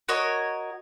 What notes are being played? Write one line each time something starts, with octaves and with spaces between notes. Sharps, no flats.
F#4 A#4 C#5 D#5